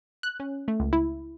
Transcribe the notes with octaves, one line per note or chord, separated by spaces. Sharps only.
F#6
C#4
A3
C#2
E4